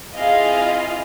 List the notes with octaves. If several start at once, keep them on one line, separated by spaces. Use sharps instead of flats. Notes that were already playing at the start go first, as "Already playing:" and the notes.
C4 E4 F4 G#4 D#5 F5